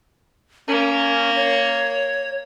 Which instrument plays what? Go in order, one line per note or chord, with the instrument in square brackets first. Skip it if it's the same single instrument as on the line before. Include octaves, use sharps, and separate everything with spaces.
[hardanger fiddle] A#3 [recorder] C#4
[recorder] C#5